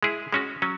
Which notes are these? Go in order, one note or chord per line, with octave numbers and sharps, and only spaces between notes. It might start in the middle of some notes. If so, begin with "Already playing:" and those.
G#3 E4 G#4
G#3 C#4 F#4
F#3 C#4